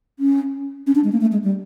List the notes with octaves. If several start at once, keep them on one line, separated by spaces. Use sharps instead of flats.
C#4
C#4
D4
G#3
A#3
A3
G#3
G3